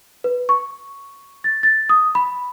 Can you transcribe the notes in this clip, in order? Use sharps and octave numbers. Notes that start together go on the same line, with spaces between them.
B4
C#6
A6
A6
D#6
B5